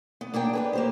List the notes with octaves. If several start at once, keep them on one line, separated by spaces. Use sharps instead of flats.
B3
A#3 D4 G#4 G5
B3 D4 B4
A#3 G4 C5